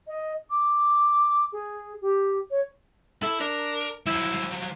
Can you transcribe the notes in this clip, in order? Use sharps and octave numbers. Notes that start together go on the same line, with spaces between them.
D#5
D6
G#4
G4
C#5
E4 A4 E5
D4 A#4
F3 F#3 E4